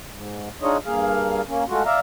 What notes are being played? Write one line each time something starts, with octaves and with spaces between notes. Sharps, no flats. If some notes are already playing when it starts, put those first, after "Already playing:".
G#2
D4 D#4 F4 G#4 C#5 D#5
G2 A#3 G#4 F5
A#3 C#4
G#3 A3 F4 F#4
D5 E5 F5 A#5